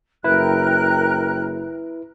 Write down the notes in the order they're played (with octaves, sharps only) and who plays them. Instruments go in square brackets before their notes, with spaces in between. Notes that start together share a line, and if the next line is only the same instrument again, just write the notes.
[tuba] F#1 [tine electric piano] E4 B4 [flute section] A#4 G5 F#6